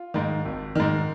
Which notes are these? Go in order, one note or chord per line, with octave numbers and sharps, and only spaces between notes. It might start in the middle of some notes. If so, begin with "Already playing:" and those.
Already playing: F4
G#2 D#3
G#1
G#2 D#3